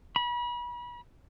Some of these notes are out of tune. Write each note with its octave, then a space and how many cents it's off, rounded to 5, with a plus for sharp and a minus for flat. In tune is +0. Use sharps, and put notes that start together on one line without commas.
B5 -35